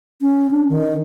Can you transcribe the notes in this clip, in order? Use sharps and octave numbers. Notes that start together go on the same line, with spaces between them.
C#4
D4
D#3